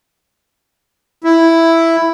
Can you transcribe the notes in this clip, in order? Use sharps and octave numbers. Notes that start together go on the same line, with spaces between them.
E4